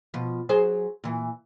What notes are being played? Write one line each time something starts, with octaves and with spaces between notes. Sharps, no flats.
B2 F3
F#3 G#4 C5
A#2 E3